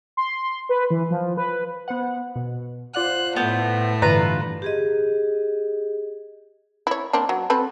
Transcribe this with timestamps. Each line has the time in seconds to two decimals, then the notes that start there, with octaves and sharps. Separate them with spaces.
0.17 C6
0.69 B4
0.90 E3
1.10 F3
1.37 B4
1.88 B3 C5 F#5
2.36 B2
2.95 F4 C5 D5 F#5 F#6
3.36 A2 A3 B3 C5
4.02 G2 D3 E3 F4 B4 A#5
4.62 G4 G#4 D#5
6.87 E4 C#5
7.13 A#3 C4 D4
7.29 F#3
7.50 C4 A4 B4